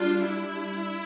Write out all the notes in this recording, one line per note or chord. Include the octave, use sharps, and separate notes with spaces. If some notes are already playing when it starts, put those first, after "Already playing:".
Already playing: G3 D4 F4
E4